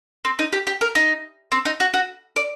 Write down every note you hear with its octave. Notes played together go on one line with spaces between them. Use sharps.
C4
D#4
G4
G4
A#4
D#4
C4
D#4
F#4
F#4
D5